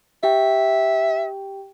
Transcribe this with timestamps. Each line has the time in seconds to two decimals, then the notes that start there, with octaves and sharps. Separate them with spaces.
0.23 G4 E5 G5